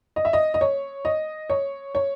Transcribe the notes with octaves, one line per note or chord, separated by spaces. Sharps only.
D#5
E5
D#5
D#5
C#5
D#5
C#5
C#5